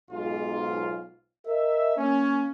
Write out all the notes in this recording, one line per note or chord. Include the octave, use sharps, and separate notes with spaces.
B1 G#2 F4
A#4 D#5 E5
A#3 C#4